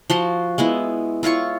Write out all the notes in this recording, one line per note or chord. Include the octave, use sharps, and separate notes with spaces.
F3 F#4 C6
G#3 B3 E4
E4 F4 C#5 C#6